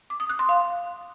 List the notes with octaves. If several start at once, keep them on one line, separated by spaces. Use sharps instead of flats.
D6
D#6
F#6
C6
F5